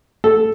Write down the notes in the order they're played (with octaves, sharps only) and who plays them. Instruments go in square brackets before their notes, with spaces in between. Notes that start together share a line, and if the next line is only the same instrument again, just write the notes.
[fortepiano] A4